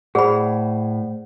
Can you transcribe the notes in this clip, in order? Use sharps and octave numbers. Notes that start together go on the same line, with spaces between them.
A2 G#4 C5 D5 F#5 B5